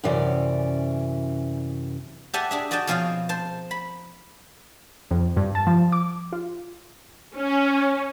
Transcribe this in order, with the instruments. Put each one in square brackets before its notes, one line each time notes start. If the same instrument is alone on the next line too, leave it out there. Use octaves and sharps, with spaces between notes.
[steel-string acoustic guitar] F#2 C3 E3 C#4 D5
[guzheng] G4 A4 E5 F#5 G#5 A5
D4 G#4 E5
F#4 D5 D#5 G5 A5
B2 F3 C4 G#4 C#5 F5
C5 A5
B5
[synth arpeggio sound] F2
G2
A5
F3
D6
F4
[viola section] C#4